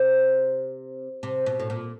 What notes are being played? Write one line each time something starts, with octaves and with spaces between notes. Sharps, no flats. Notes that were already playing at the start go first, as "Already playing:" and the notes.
Already playing: C3
C3
B2
A2
A#2